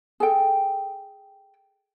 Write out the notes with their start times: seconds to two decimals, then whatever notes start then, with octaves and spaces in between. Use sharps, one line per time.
0.20 G#4 A4 G5